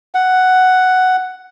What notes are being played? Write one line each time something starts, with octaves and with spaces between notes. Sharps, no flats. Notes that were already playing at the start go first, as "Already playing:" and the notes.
F#5